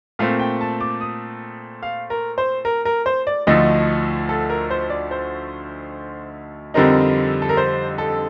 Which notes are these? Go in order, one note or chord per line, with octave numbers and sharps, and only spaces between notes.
A#2 A3 C4 F5
G5
A5
D6
D#6
F5
A#4
C5
A#4
A#4
C5
D5
D2 D3 F3 A3 D#4 D#5
A4
A#4
C5
D5
C5
F2 D3 G3 C4 D#4 A#4
A4
A#4
C5
A4